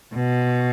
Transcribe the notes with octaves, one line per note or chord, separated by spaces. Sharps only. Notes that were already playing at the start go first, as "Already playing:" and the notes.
B2